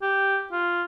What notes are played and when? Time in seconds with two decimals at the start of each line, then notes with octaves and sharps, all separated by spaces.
0.02 G4
0.52 F4